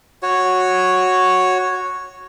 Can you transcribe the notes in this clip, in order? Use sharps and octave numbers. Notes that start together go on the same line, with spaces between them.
F#4 C#5